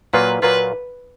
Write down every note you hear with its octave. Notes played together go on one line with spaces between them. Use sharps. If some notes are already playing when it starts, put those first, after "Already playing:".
A#2 F#3 A#3 F4 B4
A#2 F#3 A#3 F4 B4